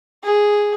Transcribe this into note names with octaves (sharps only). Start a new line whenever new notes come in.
G#4